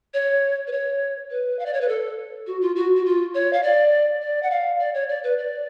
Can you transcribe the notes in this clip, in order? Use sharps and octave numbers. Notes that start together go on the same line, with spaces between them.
C#5
B4
C#5
B4
F5
D5
C#5
B4
A4
F#4
F4
F#4
F#4
F4
C#5
F5
D5
D5
F#5
F5
D5
C#5
D5
B4
D5